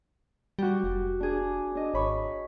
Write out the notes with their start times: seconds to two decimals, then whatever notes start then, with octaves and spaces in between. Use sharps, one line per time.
0.59 G3 F#4 G4
0.84 F1
1.20 D4 G#4
1.75 D4 D#5
1.94 G#1 C#5 B5 C#6